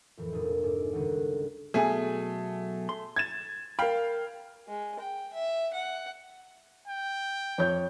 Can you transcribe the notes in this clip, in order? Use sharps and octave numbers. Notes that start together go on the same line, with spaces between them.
F2 A2 E3
F1 A#2 D4 D#6
G#2 A4 D6
G1 C#2 D#3 F#5 D#7
B1 B2 A3 G#4 G#5
C6
G#6 A6 E7
A#4 F5 G5 B5
G#3
G5
E5
F#5
G5
F2 C#5 G6